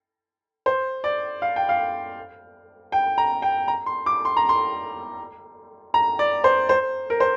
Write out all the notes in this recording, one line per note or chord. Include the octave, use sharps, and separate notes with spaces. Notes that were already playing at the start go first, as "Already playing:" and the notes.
C5
D5
F5
G5
F5
G5
A#5
G5
A#5
C6
D6
C6
A#5
C6
A#5
D5
C5
C5
A#4
C5